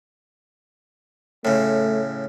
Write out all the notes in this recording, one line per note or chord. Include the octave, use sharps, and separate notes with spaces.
A2 C#3 A3